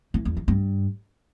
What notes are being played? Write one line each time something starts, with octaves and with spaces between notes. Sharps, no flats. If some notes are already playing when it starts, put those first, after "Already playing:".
E3
E2
E3
G2